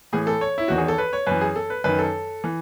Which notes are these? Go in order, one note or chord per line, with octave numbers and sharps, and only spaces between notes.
A2 E3 G#4
A4
C#5
E4
E2 D#3 F#4
G#4
A4
B4
C#5
F#2 E3 B4
G#4
A4
B4
F#2 D#3 B4
A4
E3